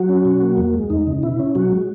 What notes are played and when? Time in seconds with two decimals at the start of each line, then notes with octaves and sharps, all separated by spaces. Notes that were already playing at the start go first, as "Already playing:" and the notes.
Already playing: F#3 F#4
0.09 C#4
0.25 B2
0.41 A#3
0.57 E2
0.74 G#3
0.90 E2 D#4
1.07 C#3
1.23 B2 E4
1.39 C#4
1.55 B2 F#3 F#4
1.72 G#3